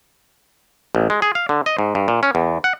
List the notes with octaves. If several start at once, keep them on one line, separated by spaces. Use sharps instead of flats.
A1
G#3
G#4
F5
D3
D#5
G#2
G2
A#2
C#4
E2
F#5